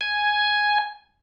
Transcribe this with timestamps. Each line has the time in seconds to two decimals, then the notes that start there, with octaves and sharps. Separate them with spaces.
0.01 G#5